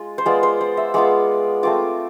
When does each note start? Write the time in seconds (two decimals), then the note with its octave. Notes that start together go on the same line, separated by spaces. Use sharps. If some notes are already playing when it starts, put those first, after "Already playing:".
Already playing: G#3 F4
0.18 C5
0.26 G#3 B3 F4 D5
0.43 C5
0.61 C5
0.77 E5
0.94 G#3 B3 F4 D6
1.63 A3 C4 F4 D6